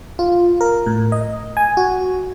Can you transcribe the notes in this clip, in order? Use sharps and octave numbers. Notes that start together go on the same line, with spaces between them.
F4
A#4
A2
D#5
G#5
F#4